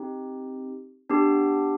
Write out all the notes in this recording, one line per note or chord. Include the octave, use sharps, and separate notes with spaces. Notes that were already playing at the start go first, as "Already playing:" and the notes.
Already playing: C4 D#4 G4
B3 D4 G4